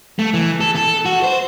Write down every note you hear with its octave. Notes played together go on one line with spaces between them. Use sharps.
A3
E3
A4
A4
F#4
C5